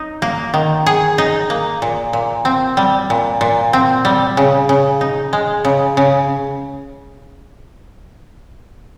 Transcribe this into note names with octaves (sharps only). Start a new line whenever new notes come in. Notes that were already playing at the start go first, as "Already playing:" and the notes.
Already playing: D#4
A#3
D#3
G#4
D#4
A#3
A#2
A#2
C4
G3
A#2
A#2
C4
G3
C#3
C#3
D#4
G#3
C#3
C#3